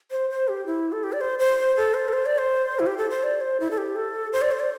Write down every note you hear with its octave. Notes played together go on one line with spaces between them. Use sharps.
C5
C5
G4
E4
A4
G4
D5
C5
C5
A4
C5
A4
C5
D5
C5
E4
G4
A4
C5
D5
C5
E4
A4
G4
A4
C5
D5
C5
D5